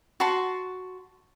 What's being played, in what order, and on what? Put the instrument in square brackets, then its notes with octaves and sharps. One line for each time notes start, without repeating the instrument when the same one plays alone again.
[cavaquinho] F#4 A5 C6